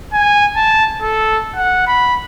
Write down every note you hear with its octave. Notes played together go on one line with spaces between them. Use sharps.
G#5
A5
A4
F#5
B5